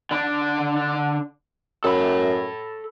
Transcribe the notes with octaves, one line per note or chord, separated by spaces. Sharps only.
D3 D4
F#2 A4 B5